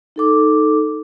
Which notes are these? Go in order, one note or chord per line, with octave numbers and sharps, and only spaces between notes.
D#4 A4 D6